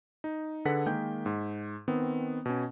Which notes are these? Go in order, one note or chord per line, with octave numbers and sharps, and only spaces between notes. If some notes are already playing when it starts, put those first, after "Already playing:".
D#4
D3 G#4 A4 B4 F#5 B6
D#3 G#3 A#3 G5 G6
G#2
D#3 B3 C4
B2 C#4